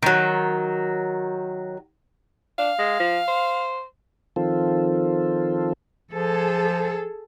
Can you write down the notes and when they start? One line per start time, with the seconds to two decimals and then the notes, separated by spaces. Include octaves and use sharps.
0.03 D#3 F#3
2.59 D4 F5
2.78 G#3
3.00 F3
3.28 C5
4.36 D#3 F3 C4 F4 A4
6.12 F3 G#4 A4